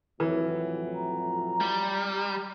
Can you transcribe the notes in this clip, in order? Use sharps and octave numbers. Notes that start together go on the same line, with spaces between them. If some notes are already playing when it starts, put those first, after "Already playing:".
F2 A2 E3 F#3
A#5
G3